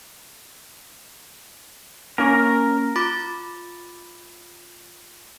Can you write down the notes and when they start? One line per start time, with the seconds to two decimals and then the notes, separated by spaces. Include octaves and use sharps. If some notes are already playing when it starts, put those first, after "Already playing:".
2.18 A#3 C#4 A#4
2.96 F4 B5 D6 A6